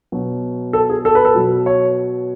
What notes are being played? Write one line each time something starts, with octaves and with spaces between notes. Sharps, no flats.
B2 F#3
A4
G#4
A4
B4
A4
B2 F#3
C#5